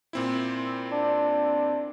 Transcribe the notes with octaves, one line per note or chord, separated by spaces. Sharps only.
A#2 C4 E4
D4